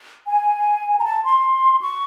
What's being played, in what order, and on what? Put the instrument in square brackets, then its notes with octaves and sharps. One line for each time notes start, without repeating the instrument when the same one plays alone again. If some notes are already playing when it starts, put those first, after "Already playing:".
[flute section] G#5
A#5
A5
C6
C#6